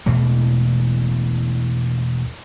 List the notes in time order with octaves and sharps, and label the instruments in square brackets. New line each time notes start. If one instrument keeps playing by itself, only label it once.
[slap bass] E2 B2 E3 A3